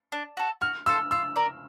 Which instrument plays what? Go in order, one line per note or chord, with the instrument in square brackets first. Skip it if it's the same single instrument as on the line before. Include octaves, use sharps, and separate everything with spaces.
[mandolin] D4
F#4 A4
[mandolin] F#4 [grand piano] F6
[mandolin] A4 C5 F5 [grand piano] E6
[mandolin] F4 [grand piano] E6
[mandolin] A#4 D5